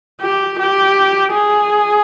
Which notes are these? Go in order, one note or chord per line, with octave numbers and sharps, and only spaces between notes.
G4
G4
G#4